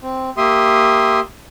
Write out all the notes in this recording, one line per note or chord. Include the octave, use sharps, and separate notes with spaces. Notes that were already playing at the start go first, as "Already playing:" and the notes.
C4
A#3 G4 E5 C6 D#6